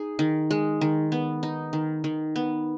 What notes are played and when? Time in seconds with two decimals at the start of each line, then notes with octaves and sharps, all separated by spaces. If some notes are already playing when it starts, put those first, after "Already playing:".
Already playing: D#4 G#4
0.19 D#3
0.51 G#3
0.81 D#3
1.12 B3
1.43 D#4
1.73 D#3
2.04 D#3
2.36 B3